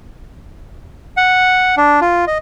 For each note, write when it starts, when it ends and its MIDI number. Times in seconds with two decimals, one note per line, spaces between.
1.17 1.75 78
1.77 2.00 62
2.01 2.25 65
2.27 2.38 75